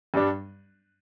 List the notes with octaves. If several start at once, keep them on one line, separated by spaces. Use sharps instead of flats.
G2 G3 D4